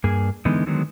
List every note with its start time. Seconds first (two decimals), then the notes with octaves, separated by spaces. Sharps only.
0.04 G2 A#3 G#4 G#5
0.45 D3 E3 G#3 B3 D#4
0.66 D3 D#3 F#3 G#3 B3